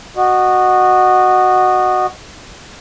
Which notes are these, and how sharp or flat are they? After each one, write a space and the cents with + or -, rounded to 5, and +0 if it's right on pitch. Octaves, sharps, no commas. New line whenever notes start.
F#4 +0 D#5 -25